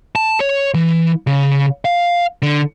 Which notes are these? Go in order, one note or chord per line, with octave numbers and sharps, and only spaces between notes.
A5
C#5
E3
C#3
F5
D3